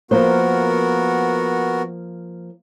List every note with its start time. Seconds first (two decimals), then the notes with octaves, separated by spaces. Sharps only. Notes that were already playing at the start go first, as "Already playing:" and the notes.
0.11 F3 A#3 B3 F#4 A#4 C5